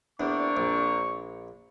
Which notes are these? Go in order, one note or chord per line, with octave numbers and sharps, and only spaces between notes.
E2 A#3 C4 D4 C#6
A#1